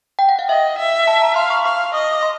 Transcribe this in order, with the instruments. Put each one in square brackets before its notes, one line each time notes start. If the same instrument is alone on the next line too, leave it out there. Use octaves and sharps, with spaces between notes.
[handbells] G5
F#5
F5
[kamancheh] D#5 [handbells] E5
[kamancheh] E5
[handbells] A5
A#5
[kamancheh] F5 [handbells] C6
[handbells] C#6
[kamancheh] F5 [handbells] C#6
[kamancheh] D#5 [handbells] D#6
[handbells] D#6
D6
C6